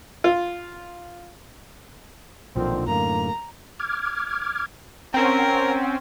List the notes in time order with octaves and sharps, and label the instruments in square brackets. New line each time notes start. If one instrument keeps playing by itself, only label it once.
[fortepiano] F4
[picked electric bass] B1 A#2 F3 [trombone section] D3 D#3 C4
[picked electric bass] F#2 A2 D3 [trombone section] A#3 [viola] A#5
[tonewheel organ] D6 F6 G#6
[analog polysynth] C4 C#4 [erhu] A#4 [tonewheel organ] F#5 G#5